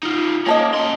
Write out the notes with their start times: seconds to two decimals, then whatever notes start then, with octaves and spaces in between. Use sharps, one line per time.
0.03 D#4 F4
0.46 A#3 C#4 A4 D#5
0.74 F#2 C6